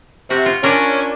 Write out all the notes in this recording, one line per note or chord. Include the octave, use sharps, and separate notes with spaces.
C3 F#4
F4
C#4 D4 A#4